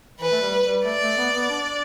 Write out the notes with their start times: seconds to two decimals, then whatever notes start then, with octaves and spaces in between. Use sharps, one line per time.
0.21 E3 B4
0.31 A3
0.42 G3
0.64 G3
0.85 A3 D5
1.02 A3
1.18 B3
1.35 B3
1.50 D4